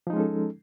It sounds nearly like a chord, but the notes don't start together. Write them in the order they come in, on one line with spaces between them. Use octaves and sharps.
F3 D#4 G#3 C#4 A4